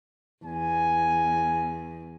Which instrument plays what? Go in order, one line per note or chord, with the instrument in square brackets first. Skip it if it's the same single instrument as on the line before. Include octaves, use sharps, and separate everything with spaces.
[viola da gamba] E2 [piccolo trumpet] G#5